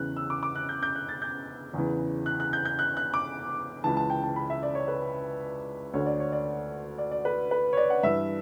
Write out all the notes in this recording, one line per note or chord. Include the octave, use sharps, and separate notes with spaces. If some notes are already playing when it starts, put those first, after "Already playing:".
Already playing: E2 C#3 E3 F#6
E6
D6
D6
F#6
G6
G6
F#6
A6
G6
E2 C#3 E3
F#6
F#6
G6
G6
F#6
F#6
D6
C#2 C#3 E3 A5
A5
G5
A5
B5
E5
D5
C#5
B4
D2 D3 C#5
D5
C#5
D5
D5
D5
B4
B4
C#5
D5
F#5
G2 E3 E5